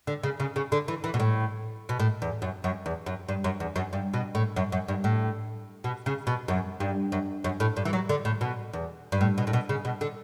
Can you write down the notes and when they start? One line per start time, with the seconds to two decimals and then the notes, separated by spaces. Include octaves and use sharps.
0.07 D3
0.23 C#3
0.40 C#3
0.56 C#3
0.72 D3
0.88 E3
1.04 E3
1.14 B2
1.20 A2
1.89 B2
1.99 A2
2.22 E2
2.42 F#2
2.64 F#2
2.86 E2
3.06 F#2
3.28 G2
3.44 F#2
3.60 E2
3.76 F#2
3.93 G2
4.14 B2
4.35 A2
4.56 F#2
4.72 F#2
4.88 G2
5.04 A2
5.84 B2
6.06 C#3
6.27 B2
6.48 F#2
6.80 G2
7.12 F#2
7.44 F#2
7.60 A2
7.77 G2
7.85 E3
7.93 F#3
8.09 D3
8.25 A2
8.41 B2
8.73 E2
9.12 G2
9.21 A2
9.38 B2
9.47 A2
9.53 B2
9.69 C#3
9.85 B2
10.01 D3